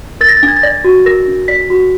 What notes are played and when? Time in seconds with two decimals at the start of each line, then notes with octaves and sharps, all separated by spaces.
0.21 A#4 A6
0.28 A#6
0.37 A6
0.43 D4
0.48 G#6
0.56 A6
0.63 D5 A#6
0.84 F#4
1.06 A#4 A#6
1.28 D4
1.48 D5 B6
1.70 F#4